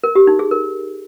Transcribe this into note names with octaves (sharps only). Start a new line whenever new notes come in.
A#4
G4
D#4
G#4
A#4